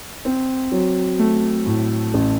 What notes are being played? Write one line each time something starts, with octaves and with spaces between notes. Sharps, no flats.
C4
F#3
A3
A2
A1